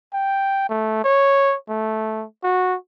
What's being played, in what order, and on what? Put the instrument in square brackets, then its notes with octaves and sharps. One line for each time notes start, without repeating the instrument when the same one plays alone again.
[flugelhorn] G5
A3
C#5
A3
F#4